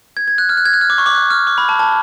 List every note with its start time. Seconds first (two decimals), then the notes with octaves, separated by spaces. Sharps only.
0.17 G#6
0.28 G#6
0.38 F#6
0.49 F6
0.57 F#6
0.65 G#6
0.74 F#6
0.81 F6
0.90 D6
0.98 C#6
1.06 D6
1.15 F#6
1.30 F6
1.47 D6
1.58 B5
1.69 A5
1.79 A5